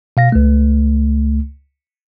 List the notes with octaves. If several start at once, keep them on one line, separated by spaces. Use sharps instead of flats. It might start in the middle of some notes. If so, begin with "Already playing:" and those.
B2 F5 A#6
C#2 A3